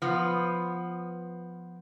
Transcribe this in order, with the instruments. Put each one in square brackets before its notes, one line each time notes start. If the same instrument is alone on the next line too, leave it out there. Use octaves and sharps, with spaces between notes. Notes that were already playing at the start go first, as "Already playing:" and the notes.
[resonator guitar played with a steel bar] F3 B3